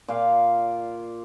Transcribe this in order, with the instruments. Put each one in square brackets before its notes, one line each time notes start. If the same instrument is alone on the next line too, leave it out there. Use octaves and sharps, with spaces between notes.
[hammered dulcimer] A#2 F4 D5 F5